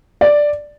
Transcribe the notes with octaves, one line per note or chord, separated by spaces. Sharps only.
D5